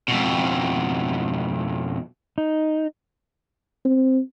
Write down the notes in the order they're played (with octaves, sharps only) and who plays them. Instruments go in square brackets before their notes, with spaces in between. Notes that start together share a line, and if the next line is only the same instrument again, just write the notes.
[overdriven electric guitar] F2 B2
[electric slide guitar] D#4
[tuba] C4